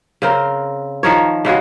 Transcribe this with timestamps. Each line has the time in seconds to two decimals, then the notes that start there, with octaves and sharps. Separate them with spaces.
0.22 C#3 C4 A#4
1.03 D#3 F3 A#4 C#5
1.45 C#3 G#3 F#4 G#4